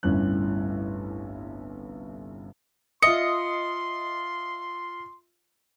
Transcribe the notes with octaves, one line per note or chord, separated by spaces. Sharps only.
G1 C2 A2 C#4 F#6
F4 D#5 E5 C6 C#7